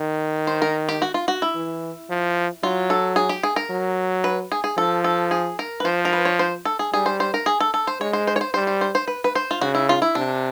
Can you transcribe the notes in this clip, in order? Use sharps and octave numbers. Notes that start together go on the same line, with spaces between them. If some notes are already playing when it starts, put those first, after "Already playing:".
Already playing: D#3
C5
A#4
G4
F#4
F4
F#4
E4
E3
F3
F#3 F4
A4
G#4
G4
G#4
A#4
F#3
B4
G#4
G#4
F3 A4
A4
G#4
A#4
B4
F3 C5
A#4
B4
C#5
C5
A4
G#4
G3 G#4
C5
C5
A#4
G#4
A4
A4
C5
G#3 C#5
C5
C5
C#5
C5
G3 C5
C5
C5
C5
B4
B4
C5
F4
C#3 F#4
E4
F4
E4
C3 D4